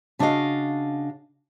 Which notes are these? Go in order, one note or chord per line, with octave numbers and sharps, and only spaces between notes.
C#3 D4 E4 F#4 D#5 F5